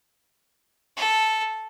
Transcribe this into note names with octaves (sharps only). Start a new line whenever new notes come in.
A4